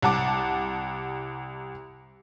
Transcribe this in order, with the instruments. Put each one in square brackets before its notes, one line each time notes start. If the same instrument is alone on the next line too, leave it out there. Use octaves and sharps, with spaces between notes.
[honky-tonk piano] C2 F#5 A5 D6